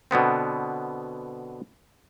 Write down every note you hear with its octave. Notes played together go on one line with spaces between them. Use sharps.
B2 D3 B3 C4